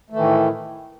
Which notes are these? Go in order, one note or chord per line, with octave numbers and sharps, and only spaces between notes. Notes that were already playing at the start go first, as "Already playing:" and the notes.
A2 D#3 E3 A3